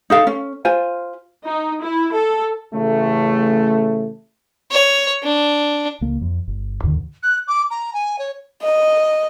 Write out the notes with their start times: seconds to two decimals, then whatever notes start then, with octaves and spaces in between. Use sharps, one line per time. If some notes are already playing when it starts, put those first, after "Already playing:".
0.10 D#4 A4 F5
0.27 C#4
0.65 F4 C5 G#5
1.45 D#4
1.81 E4
2.14 A4
2.72 A1 C#3 A3
4.71 C#5
5.23 D4
6.01 C#2 A#3
6.21 F2
6.48 G1
6.84 D#2 G#2 D3 D#3
7.22 F#6
7.47 D6
7.70 A#5
7.93 G#5
8.18 C#5
8.62 D#5